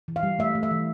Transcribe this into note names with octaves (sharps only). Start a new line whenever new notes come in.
E3
F5
G3
A3 E5
A3
E5
E3